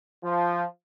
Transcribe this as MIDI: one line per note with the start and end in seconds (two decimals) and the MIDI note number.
0.24 0.64 53